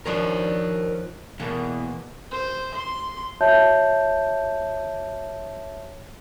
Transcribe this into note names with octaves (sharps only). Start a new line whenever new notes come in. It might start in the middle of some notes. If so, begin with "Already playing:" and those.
D#3 F3 D4 A#4 C#5
E2 B2 A#3 B3
C5
C6
F#4 C#5 E5 A5 G6